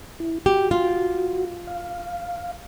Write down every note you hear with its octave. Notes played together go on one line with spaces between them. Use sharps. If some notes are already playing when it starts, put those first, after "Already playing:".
E4
F#4 G4
F4
F5